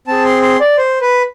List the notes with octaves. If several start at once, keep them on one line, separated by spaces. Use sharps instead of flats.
C4 G#4 A5
C6
C6
D5
C5
B4